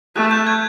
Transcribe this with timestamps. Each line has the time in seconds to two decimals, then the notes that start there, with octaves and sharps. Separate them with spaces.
0.16 A3 F#6
0.31 G6
0.47 G#6